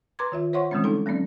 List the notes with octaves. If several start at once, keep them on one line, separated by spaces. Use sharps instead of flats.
B4 A#5 C6 D6 G#6
D#3 F4 E5
C5 C#5 E5 F#5 C6 C#6
D3 E3 G3 G#3 C4 C#4
D4 D#4 A4
F#3 A#3 C4 C#4 D5